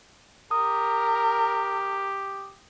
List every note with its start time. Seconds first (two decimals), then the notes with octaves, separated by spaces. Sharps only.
0.51 G4 A#4 D#6